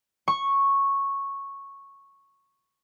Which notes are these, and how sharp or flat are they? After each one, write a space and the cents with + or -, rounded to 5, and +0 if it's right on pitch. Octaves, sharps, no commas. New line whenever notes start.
C#6 -5